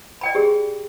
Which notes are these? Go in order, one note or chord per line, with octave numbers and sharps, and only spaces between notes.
D5 G5 B5
G4 G#4